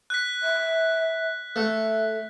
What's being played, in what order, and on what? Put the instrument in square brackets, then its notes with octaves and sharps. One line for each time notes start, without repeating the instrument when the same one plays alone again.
[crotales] F#6 B6
[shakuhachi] E5
[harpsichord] A3 [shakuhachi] E5